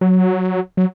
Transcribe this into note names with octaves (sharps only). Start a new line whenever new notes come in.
F#3
F#3